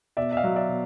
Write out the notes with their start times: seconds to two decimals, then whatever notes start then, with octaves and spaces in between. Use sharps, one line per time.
0.17 B2 D5 E5
0.32 E5
0.37 D#5 F5
0.44 F#3
0.56 D5 E5
0.69 B2